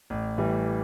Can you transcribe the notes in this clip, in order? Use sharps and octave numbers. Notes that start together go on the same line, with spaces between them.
A1
A2 E3 G3